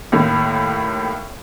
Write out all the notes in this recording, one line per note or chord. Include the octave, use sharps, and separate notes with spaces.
D#2 A2